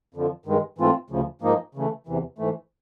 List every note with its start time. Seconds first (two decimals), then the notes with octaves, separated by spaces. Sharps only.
0.14 F2 D3 F3
0.46 G2 D#3 G#3
0.78 G#2 E3 A3 C4 F4
1.10 D2 C#3 F3
1.41 G#2 F3 A#3 D#4
1.75 C#3 E3 A3
2.07 E2 C3 E3
2.38 G#2 E3 A3